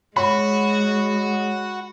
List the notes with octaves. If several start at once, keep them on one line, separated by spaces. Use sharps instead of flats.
G#3 F#4 C#5 B5